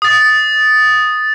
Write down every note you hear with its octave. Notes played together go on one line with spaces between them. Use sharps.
D#6 A6